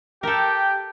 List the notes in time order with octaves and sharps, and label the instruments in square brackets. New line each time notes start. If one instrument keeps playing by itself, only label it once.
[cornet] G4 [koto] A4 A#4 [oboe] G5